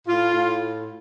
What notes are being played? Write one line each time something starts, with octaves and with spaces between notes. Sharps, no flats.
A2 F4
A2